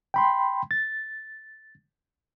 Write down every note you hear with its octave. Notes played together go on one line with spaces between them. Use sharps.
G5 B5 C6
A6